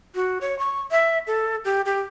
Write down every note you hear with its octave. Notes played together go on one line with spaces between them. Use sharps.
F#4
C#5
C#6
E5
A4
G4
G4